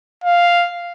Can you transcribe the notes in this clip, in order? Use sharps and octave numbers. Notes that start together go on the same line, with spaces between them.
F5